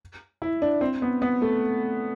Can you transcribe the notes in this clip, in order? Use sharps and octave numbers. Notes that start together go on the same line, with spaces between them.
E4
D4
C4
B3
B3
A3